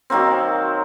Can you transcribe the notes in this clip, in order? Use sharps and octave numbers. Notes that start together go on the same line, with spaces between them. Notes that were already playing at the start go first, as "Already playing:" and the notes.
D#3 F#3 A#3 C4